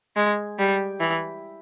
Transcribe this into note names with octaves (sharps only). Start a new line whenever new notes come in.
G#3
G3
E3